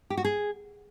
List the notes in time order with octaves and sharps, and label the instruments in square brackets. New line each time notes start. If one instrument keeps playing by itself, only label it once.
[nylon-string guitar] G4
F#4
G#4